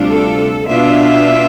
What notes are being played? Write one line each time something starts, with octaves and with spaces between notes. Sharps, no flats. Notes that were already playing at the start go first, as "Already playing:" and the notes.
Already playing: D2 C3 G3 D4 F4
A4
B2 B3 D4 F4 E5